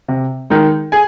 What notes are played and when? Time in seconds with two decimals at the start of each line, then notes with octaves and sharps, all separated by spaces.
0.08 C3
0.50 D#3 G#3 D#4
0.92 G#4 G#5